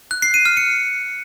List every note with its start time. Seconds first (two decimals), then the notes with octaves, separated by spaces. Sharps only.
0.11 F#6
0.22 C7
0.34 D#7
0.46 F6
0.57 C#7